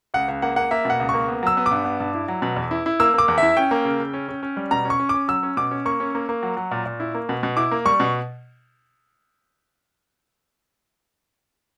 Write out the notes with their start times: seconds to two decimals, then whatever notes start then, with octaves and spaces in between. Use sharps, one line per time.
0.14 C#2 F#5
0.28 C#2
0.42 A#3 F#5
0.56 A#3 F#5
0.71 A#3 E5
0.85 B2 F#5
0.99 C#2
1.09 A#3 C#6
1.28 B3
1.43 F#3 E6
1.57 B3
1.66 D6
1.71 G2
1.85 B3
2.00 G2
2.14 E4
2.28 F#3
2.42 B2
2.56 E2
2.71 E4
2.86 E4
3.00 A#3 E6
3.14 A#3 D6
3.28 E2
3.38 E4 E5
3.57 C#4 G5
3.71 A#3
3.85 C#3
4.00 C#3
4.13 C#4
4.28 C#4
4.43 C#4
4.57 G3
4.71 B2 A#5
4.85 C#4
4.90 C#6
4.99 C#4
5.09 C#4 D6
5.28 F#3 E6
5.43 C#4
5.57 B2 D6
5.71 C#4
5.85 A#3 C#6
6.00 C#4
6.15 A#3
6.29 A#3
6.43 F#3
6.57 F#3
6.71 A#2
6.86 A#2
7.00 E4
7.15 A#3
7.29 B2
7.43 B2
7.57 E4 D6
7.72 A#3
7.85 G3 C#6
8.00 B2